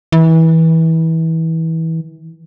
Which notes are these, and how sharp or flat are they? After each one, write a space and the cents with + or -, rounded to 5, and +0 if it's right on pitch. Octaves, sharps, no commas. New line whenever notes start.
E3 -25